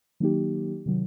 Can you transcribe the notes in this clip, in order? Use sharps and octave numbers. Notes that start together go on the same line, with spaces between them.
D#3 F#3 A#3 D#4 G4
C3 D#3 F#3